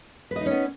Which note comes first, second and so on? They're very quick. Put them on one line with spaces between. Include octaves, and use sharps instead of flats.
B4 D#5 D#4 C#4 B3